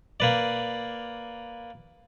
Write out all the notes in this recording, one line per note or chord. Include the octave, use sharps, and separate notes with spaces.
A#3 B4 D5